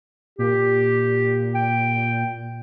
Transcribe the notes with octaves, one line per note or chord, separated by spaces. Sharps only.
A#2 G4
G5